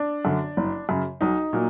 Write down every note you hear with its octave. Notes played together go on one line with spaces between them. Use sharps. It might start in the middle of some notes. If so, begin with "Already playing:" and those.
Already playing: D4
F#2 D3
F#1
F#2 C#3
B1 D#4
A#2 F#3 A#3